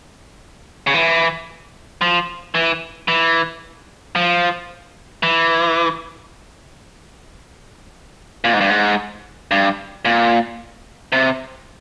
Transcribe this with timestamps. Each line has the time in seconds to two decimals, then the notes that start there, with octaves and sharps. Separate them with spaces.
0.87 C#3
0.94 E3
2.01 F3
2.55 E3
3.08 E3
4.15 F3
5.23 E3
8.44 A#2
8.53 G#2
8.61 G2
8.69 G#2
9.51 G2
10.05 A#2
11.12 C3